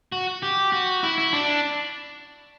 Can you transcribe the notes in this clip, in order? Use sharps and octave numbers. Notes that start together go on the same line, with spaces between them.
F#4
G4
F#4
E4
E4
D4